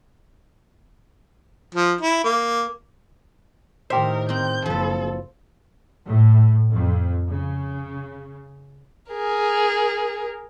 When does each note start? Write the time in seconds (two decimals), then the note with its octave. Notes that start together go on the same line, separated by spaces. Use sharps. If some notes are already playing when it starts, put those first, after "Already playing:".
1.75 F3
2.01 E4
2.24 A#3
3.90 A2 D#3 G4 A#4 C5 E5
4.29 C4 A#4 G6
4.66 F#1 F3 A4 B4
6.06 A2
6.72 F2
7.28 C#3
9.11 G#4 A#4